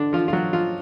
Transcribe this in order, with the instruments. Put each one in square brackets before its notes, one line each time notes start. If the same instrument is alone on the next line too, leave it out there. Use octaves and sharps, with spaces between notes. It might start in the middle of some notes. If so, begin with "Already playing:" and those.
Already playing: [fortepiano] D3 D4
F3 F4
F4
F#3 F#4
F3 F4